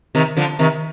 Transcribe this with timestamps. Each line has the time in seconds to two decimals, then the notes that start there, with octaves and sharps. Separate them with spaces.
0.15 C3 D#3
0.37 D3 F3
0.59 C3 D#3